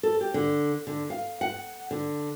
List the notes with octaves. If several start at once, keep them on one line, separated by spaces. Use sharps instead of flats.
A4
G4
D3
D3
F5
F#5
D3